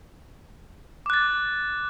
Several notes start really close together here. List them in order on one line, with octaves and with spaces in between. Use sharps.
D6 F#6 A6